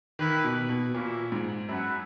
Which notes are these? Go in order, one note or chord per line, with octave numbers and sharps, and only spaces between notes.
D#3 A#3 E4 B4
B2
B2
A#2 A#3 C#4 E4
G#2
F#2 E4 B4 F#5